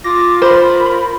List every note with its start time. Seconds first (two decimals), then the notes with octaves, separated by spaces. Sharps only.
0.04 F4 D6 A#6
0.42 A#4 C5 B5